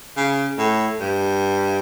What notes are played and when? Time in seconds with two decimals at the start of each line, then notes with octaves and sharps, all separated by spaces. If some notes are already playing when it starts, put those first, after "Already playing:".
0.16 C#3
0.58 A2
1.00 G2